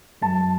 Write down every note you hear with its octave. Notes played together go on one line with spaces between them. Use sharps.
F#2 A5